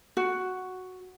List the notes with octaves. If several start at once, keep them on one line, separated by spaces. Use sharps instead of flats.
F#4